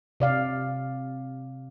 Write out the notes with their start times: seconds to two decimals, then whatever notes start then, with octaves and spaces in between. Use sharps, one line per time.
0.20 C3 D5 F5